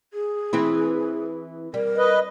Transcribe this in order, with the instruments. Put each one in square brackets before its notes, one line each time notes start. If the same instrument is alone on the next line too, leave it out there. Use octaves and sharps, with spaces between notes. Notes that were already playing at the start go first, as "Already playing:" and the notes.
[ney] G#4
[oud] E3 C4 E4
[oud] G3 [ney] A#4
[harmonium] B4 D#5